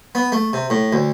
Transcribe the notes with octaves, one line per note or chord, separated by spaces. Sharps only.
B3
A3
C3
A2
D2